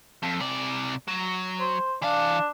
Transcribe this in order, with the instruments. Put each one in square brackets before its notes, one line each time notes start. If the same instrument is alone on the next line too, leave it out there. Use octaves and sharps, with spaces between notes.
[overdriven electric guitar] F2
C3 D5
F#3
[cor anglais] C5
[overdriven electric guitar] E3 F5 [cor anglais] D4